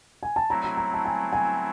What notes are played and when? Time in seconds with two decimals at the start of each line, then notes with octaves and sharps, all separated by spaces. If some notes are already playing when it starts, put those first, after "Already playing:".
0.23 G#5
0.36 A5
0.50 F#3 A3 C4 E4 A#5
0.77 A#5
0.94 A5
1.05 G#5
1.33 G#5